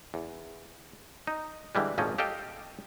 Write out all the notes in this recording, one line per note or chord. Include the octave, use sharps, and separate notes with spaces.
E2
D#4
D3 E3 G3 G#3
G#1 F2 A#2 F3 C#4 D#5
G4 A4 D#5 F5 G5